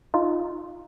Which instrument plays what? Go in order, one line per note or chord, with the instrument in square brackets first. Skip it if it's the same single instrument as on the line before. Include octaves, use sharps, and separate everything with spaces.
[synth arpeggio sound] D#4 F4